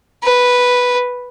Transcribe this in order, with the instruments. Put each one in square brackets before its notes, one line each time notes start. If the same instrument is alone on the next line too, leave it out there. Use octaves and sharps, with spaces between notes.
[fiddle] B4